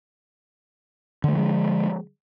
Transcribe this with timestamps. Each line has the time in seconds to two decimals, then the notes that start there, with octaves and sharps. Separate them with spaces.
1.24 D3
1.28 A3
1.33 F3
1.37 G#3